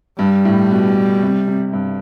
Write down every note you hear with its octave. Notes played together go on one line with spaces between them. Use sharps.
G2 G3
A2
B2
C3
C3
G2